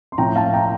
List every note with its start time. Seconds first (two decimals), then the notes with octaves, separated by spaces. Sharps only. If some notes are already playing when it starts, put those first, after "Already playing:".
0.12 C6
0.18 A2 F3 C4 G5 A#5
0.36 F5 A5
0.53 G5 A#5